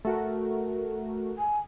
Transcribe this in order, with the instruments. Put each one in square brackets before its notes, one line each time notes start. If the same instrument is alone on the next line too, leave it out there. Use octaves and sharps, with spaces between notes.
[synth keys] A3 F#4 A#4
[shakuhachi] G#5